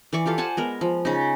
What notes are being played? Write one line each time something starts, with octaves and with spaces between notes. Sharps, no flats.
E3 D5 C#6 D6
F4 G4 A4 F5
C5 F#5 G#5 A5
G#3 B3 A#4
F3
C#3 D#4